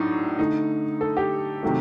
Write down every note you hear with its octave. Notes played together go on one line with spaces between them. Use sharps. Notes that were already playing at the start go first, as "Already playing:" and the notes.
Already playing: A2 F#3 D4 D#4
D3 A3 D#4
A4
G4
C3 D#3 F#3 A3